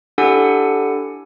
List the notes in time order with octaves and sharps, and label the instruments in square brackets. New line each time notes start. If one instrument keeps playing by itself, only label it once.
[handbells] D4 E4 G4 A4 F#5 G#5